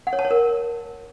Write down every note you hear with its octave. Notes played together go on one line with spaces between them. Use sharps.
F#5
C#5
A5
C#5
A#4